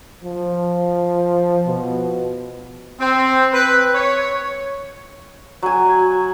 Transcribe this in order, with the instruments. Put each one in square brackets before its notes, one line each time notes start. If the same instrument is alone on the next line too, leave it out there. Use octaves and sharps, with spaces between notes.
[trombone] F3
B2
[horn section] C4
B4
C#5
[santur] F#3 G#5